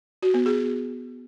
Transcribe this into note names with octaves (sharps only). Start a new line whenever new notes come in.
F#4
B3
G#4